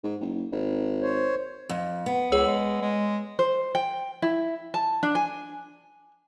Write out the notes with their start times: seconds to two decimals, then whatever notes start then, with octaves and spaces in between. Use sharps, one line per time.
0.04 G#2
0.20 F#1
0.52 G#1
1.02 C5 C#5
1.69 F2
2.06 B3
2.32 C#2 G#4 C#5 E6
2.46 G#3
2.82 G#3
3.39 C5
3.75 G5
4.22 E4
4.74 A5
5.03 D4
5.15 G#5